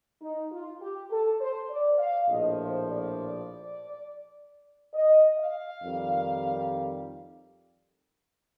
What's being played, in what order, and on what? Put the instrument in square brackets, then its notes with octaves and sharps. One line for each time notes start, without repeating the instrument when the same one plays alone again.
[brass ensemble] D#4
F4
G4
A4
C5
D5
F5
A#1 A2 F3 D#5
C5
D5
D#5
F5
F2 D#3 G3